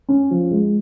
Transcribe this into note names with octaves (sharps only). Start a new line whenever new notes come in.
C#4
F3
G#3